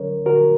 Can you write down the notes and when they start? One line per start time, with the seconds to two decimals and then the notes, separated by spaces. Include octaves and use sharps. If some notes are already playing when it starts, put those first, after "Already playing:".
Already playing: D3 F#3 C#4 A#4 C#5
0.26 D3 F#4 A#4